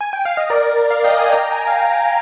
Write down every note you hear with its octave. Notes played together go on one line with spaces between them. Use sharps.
G#5
G5
F5
D#5
A#4 D5
D5 F5
D#5 G5
F5 G#5
G5 A#5
G#5
G5
F5 G#5